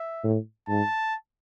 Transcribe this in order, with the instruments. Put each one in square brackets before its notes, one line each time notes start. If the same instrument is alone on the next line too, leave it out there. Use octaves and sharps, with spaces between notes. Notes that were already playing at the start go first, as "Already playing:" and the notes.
Already playing: [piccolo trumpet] E5
[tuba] A2
[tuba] G#2 [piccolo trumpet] A5